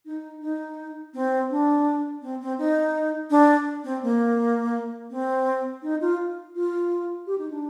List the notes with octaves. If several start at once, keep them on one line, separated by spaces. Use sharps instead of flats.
D#4
D#4
C4
D4
C4
C4
D#4
D4
C4
A#3
C4
D#4
F4
F4
G4
D#4
D4